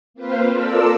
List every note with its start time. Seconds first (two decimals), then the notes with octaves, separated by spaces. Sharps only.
0.14 A#3 C4 F4 B4 C5 F5
0.51 F4 A4 A#4 D5 A5 E6